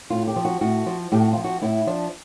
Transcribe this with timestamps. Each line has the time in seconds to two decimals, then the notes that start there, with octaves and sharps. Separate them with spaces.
0.10 A2 F4
0.27 G4
0.36 F3
0.45 F#4
0.61 A2 F#4
0.86 F3
1.12 A2 G4
1.22 F#4
1.33 F3 F4
1.44 F#4
1.62 A2 E4
1.87 F3 D4